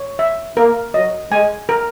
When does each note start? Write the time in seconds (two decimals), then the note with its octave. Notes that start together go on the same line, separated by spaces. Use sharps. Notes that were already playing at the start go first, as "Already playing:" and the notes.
Already playing: C#5
0.19 E5
0.57 A#3 A#4
0.94 F#3 D#5
1.32 G#3 G#5
1.69 A#4